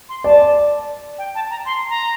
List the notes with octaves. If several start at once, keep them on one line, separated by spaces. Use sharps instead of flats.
C6
D5 A5
G5
A5
A#5
C6
A#5